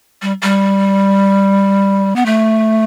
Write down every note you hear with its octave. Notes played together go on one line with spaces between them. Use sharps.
G3
G3
B3
A3